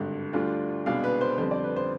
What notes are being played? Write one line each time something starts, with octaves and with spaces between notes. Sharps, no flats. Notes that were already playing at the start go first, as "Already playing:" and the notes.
Already playing: G#1 G2 D3
D2 D3 G3 D4 F4
C2 B2 G#3 D4 F5
B4
C5
F2 D3 G3 C4 C5
D5
B4
C5